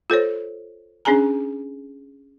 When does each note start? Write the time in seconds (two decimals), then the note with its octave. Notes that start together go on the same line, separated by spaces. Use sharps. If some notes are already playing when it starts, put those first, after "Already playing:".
0.10 F4 A4 C5 C#5
1.05 C#4 D4 G#4 G#5 A#5